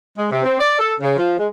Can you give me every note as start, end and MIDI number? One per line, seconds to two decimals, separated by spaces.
0.17 0.27 56
0.31 0.41 48
0.44 0.58 60
0.59 0.78 74
0.79 0.93 69
1.01 1.16 49
1.17 1.38 53
1.38 1.47 56